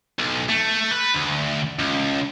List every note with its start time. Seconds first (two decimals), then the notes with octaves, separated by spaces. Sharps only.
0.19 B1
0.49 A3
0.91 B4
1.14 D2
1.79 C#2